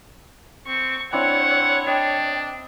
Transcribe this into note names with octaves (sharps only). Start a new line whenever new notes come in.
C4 C#6
C4 D4 E4 C#5 F#5
D4 D#5 G5